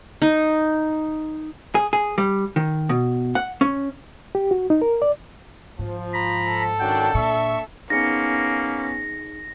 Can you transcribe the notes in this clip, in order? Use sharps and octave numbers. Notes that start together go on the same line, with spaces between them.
D#4
G#4
G#4
G3
D#3
B2
F#5
C#4
G4
F#4
D#4
A#4
D5
G#2 F3
A#5 B5
A4
D#3 C#4 D4 F#4 G5
A#2 D4 E5 C#6
A#3 B3 C#4 D#4 G#4 A#6 C#7